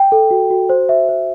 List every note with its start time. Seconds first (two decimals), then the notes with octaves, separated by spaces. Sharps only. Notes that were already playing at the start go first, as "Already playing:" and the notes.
Already playing: G5
0.12 A4
0.31 F#4
0.50 F#4
0.69 C5
0.89 E5
1.09 C5